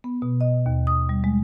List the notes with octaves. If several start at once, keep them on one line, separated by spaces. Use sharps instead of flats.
B3
B2
D#5
D#2
D#6
G3
G#3